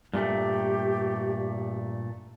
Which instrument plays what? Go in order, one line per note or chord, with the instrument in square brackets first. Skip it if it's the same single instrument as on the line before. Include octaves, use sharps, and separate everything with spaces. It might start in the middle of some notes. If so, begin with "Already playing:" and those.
[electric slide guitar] G2 A#2 A3 [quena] G4